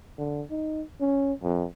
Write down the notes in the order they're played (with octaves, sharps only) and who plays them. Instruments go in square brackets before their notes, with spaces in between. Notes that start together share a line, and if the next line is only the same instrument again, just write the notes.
[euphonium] D3
D#4
C#4
F2